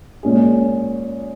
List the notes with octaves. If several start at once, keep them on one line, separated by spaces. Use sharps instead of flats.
A#2 G#3 C#4 G#4